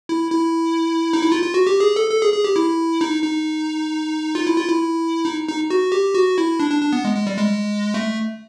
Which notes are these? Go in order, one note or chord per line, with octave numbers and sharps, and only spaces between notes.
E4
E4
D#4
E4
F4
F4
F#4
G4
G#4
A4
A4
G#4
G#4
G4
E4
D#4
D#4
F4
E4
F4
E4
D#4
D#4
F#4
G4
F#4
E4
D4
D4
D4
B3
G#3
G#3
G3
G#3
A3